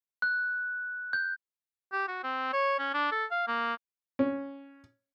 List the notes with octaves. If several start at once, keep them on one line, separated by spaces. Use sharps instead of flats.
F#6
G6
G4
F#4
C4
C#5
C#4
D4
A4
F5
A#3
C#4